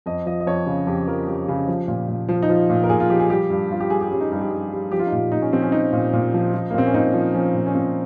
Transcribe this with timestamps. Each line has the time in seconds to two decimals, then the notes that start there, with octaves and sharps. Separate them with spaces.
0.06 F2 D#5
0.26 F3 D#5
0.40 D#5
0.46 F2 C#5
0.67 C#3
0.87 F2 G4
1.07 F3 A#4
1.27 F2 G4
1.48 C#3
1.68 F3
1.88 A#2
2.09 A#2
2.29 F3
2.42 D#4
2.49 F3 F4
2.70 A#2
2.84 A#4
2.89 A#2 G#4
3.00 F4
3.10 F3 G4
3.20 G#4
3.30 G3 G4
3.50 G2
3.70 G2 F4
3.80 G4
3.90 G3 G#4
4.01 G4
4.11 G3 C#4
4.20 D#4
4.31 G2 D#4
4.41 G4
4.51 G2
4.72 G3
4.92 F3 G4
4.99 F4
5.07 D#4
5.12 A#2 F4
5.32 A#2 D#4
5.42 C#4
5.52 F3 C4
5.62 C#4
5.72 F3 D#4
5.92 A#2
6.13 A#2
6.34 F3
6.54 F3
6.71 A#3
6.74 A#2 C4
6.87 C#4
6.94 A#2 D#4
7.14 F3
7.34 F3 C#4
7.55 A#2
7.66 C#4
7.74 A#2 C4